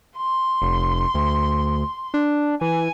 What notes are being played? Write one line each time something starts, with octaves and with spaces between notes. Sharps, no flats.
C6
F1
D2
D4
E3 G#5